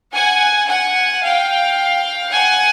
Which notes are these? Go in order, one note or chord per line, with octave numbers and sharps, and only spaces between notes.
F#5 G#5
F#5 G#5
F5 G5
F#5 G#5